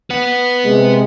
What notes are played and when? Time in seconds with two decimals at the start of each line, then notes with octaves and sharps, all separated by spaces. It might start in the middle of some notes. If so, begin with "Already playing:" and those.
0.10 B4 F#5
0.65 C3 G#3